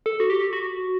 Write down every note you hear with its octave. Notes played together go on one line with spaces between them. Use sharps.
A4
F#4
G4
F#4